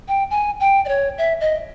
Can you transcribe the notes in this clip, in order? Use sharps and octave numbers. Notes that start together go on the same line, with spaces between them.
G5
G#5
G5
D5
C#5
E5
D#5